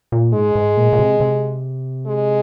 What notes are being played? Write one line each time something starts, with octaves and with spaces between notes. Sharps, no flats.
A#2
G#2 G#3
G#2
A#2
A#2
C3
C3
G#3